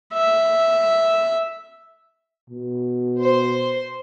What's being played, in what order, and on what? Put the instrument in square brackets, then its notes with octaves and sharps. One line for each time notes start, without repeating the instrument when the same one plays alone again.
[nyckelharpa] E5
[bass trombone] B2
[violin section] C5 C6